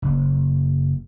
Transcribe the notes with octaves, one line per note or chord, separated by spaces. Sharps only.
F#1